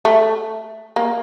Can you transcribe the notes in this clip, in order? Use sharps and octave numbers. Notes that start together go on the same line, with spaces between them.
A3
A#3